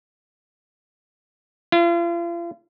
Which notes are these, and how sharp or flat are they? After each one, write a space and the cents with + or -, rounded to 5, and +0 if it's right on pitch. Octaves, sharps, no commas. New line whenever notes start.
F4 -40